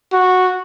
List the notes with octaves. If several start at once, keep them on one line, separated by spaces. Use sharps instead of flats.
F#4